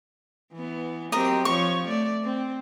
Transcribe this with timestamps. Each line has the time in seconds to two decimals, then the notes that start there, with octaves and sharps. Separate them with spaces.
0.53 E3 B3
1.12 F#3 C4 G4 A#4 D#5
1.45 F3 C#5 C#6
1.87 A3 D5
2.23 C4